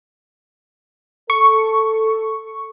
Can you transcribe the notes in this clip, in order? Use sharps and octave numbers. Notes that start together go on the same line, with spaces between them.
A4 C#6